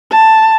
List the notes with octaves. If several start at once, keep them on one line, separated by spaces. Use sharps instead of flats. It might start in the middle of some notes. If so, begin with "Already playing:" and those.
A5